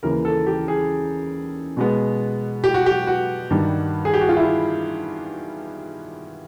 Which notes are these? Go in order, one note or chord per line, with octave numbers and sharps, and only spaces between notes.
D#2 C#3 E3 A#4
A4
G4
G#4
B2 G#3 B3
G4
F#4
G4
F#4
G2 D#3 G3
G#4
G4
F#4
F4
E4